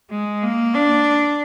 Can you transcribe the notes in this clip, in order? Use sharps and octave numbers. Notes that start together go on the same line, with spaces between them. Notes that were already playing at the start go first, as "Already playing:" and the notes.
G#3
A#3
D4